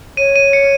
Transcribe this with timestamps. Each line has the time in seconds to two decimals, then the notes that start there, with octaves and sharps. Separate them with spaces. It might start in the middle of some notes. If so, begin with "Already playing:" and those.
0.17 C#5 D#7
0.36 D#7
0.53 C#7